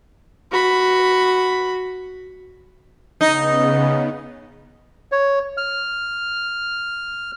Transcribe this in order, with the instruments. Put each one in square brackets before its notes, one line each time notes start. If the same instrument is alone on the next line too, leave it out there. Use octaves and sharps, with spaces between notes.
[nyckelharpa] F#4 B5
[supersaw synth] C#3 B3 [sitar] D#4
[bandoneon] C#5
F6